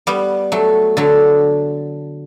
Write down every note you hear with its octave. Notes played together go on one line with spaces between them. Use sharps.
G3 B3
F#3 A3
D3 F#3